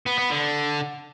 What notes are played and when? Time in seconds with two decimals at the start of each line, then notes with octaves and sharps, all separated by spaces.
0.06 B3
0.18 B3
0.30 D3